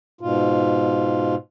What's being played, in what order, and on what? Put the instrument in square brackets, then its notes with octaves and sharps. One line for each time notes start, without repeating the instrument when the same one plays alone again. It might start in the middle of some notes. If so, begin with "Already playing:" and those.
[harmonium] G#2 B2 F4